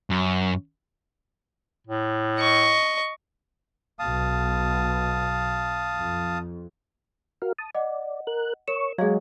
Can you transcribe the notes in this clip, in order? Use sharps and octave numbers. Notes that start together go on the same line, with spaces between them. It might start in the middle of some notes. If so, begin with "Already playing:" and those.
F#2
A2
D#5 C#6
B1 B2 F5 A5 D#6
F2
F#4 A#4 F5
A5 D#6
D5 D#5 F#5
A#4 F#6
A#4 C#5 C#6 E7
F#3 G#3 G#4 D#5 F5 G#5